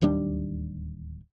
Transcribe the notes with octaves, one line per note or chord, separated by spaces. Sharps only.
D1 D#2 G3 D4